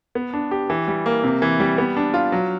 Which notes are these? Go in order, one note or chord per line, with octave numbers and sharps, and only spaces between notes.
B3
D4
G4
E3
G3
A#3
C3
E3
G3
B3
D4
F4
F#3